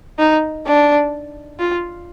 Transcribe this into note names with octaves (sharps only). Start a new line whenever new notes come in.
D#4
D4
F4